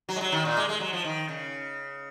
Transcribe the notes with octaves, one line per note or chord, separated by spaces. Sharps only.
F#3
G#3
F#3
D#3
A#2
G#3
G#3
F#3
F3
D#3
C#3